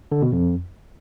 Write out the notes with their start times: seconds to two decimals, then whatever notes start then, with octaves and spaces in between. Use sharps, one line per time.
0.12 D3
0.22 B2
0.32 F2